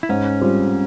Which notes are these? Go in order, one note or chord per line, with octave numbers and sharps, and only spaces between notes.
E4
G#2 C#4
G3 C4 F4